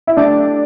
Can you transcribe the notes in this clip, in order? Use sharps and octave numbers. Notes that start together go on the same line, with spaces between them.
E4
A3 D4 G4 D5